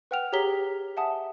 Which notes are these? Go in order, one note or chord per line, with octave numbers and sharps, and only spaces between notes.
B4 F#5 G5 F6 F7
G4 G#4 C#5 A#5 B6 G7
E5 F#5 G#5 A5 D#6